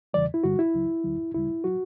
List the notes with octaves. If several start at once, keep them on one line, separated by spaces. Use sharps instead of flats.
E2 C#3 E3 G3 D5
E4
G2 D3 G3 F#4
E4
C#2 C#3 F#3
D2 D3 F#3
D2 C#3 G3 E4
F#3 F#4